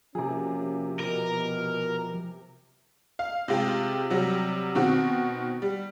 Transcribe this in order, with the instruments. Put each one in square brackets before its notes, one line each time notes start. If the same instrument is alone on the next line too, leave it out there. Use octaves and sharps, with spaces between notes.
[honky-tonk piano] C3 G#4 [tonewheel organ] F3 [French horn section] A#3 C#4 F#4
[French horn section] B2 [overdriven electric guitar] A#4
[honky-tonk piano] F5
C3 G#3 F4 G4
C3 F#3 G3
B2 D#3 C4 F#4
G3